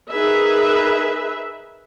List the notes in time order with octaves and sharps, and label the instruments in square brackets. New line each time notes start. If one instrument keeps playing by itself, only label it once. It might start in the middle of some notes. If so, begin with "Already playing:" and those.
[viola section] D#4 G#4 A#4 B4 E5